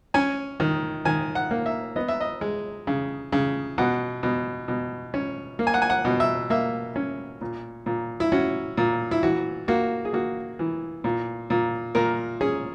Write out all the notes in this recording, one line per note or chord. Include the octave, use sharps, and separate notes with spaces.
C#4 G#5
D#3
D#3 G#5
F#5
A#3
E5
B3 D#5
E5
D#5
G#3
C#3
C#3
B2 F#5
B2
B2
C#4
A#3
G#5
F#5
G#5
F#5
B2
E5
A#3 E5
C#4
A#2
A#2
E4
C#4 F#4
A#2
E4
E3 F#4
A#3 F#4
G#4
A#3 F#4
E3
A#2
A#2
A#2 A#4
C#4 G#4